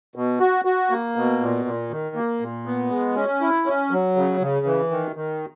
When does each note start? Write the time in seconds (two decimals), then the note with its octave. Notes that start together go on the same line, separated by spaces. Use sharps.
0.16 B2
0.40 F#4
0.65 F#4
0.90 A#3
1.16 B2
1.41 A#2
1.65 A#2
1.91 D#3
2.15 A#3
2.41 A#2
2.66 B3
2.90 G#3
3.15 C#4
3.41 E4
3.66 C#4
3.91 F#3
4.16 C#3
4.41 C#3
4.66 E3
4.91 D#3
5.16 D#3